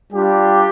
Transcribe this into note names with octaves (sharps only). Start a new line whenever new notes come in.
G3 D4 F4 G4